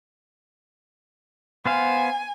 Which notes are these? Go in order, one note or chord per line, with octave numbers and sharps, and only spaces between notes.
B3 C5 F5 G#5